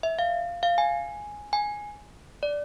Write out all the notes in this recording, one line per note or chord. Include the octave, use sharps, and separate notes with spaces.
E5
F5
F5
G#5
G#5
D5